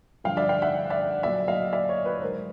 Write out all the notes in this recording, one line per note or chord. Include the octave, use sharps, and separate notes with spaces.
G2 D3 F3 F5 G5
D5 E5
F5 G5
E5 F#5
D5 E5
A#2 F#3 D5 E5
D#5 F5
D5 E5
C#5 D#5
B4 C#5
G#2 D#3 F#3 A#4 C5